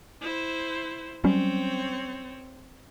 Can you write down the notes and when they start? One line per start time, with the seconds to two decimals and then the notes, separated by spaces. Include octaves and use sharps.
0.21 E4 C5
1.24 F#3 G3 C4 C#4 C#5